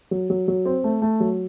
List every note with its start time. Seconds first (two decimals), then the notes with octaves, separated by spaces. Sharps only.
0.11 F#3
0.30 F#3
0.48 F#3
0.66 C4
0.84 A3
1.02 A3
1.20 F#3